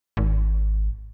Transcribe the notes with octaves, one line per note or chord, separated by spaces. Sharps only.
G#1